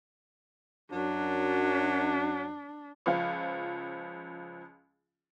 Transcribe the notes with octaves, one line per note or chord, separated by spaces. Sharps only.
F#2 F#3 D4
C#2 F3 F5